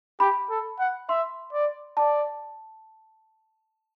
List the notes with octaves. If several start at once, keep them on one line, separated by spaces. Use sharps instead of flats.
G4 B5
A4
F#5
E5 C6
D5
D5 A5